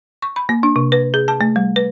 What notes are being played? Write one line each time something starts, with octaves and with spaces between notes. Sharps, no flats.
C#6
B5
A#3
D4
C3
B4
G#4
A5
A3
G3
B4